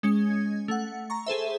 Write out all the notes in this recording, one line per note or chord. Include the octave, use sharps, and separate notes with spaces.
G#3 C#4 G#6
A3 F#5
A#5 C#6
G#4 A4 C5 E5